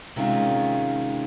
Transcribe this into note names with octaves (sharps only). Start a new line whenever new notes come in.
C3 D#3 G#3 C#4 F4